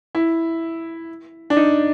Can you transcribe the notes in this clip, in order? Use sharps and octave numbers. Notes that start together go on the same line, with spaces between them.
E4
D4
D#4